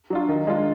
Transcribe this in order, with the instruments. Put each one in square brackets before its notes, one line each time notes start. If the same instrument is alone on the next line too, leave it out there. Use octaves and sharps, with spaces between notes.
[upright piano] F#3 D4 F4
D#3
G#3 D4 F4